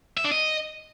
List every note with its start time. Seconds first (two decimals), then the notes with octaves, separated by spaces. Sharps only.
0.17 E5
0.24 D4
0.32 D#5